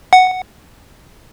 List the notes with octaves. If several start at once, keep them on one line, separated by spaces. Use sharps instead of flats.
F#5